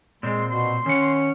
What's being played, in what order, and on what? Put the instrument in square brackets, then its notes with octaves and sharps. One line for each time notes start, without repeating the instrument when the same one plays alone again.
[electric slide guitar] A#2 C4 [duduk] G#3 [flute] C6
[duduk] B2 [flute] C6
[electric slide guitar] D#3 F#5 [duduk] C#4